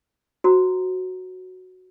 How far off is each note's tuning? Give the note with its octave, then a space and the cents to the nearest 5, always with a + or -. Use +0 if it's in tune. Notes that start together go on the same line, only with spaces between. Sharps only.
F#4 +0 C5 +0 A#5 +0